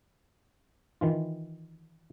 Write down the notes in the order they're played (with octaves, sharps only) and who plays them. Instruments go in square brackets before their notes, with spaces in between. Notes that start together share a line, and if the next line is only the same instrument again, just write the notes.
[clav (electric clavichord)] D#3 E3 F4